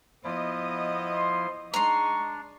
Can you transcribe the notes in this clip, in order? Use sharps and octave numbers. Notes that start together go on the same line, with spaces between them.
F3 B3 E4 D#5
C6
G#3 D4 D#4 A#5 C6 C#6